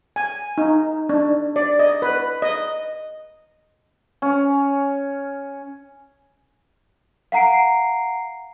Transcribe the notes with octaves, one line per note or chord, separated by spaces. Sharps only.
G#5
D#4
D4
D5
D#5
B4
D#5
C#4
F5 F#5 A#5 C7 D7